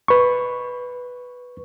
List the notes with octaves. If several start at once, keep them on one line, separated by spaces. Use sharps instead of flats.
B4 C#6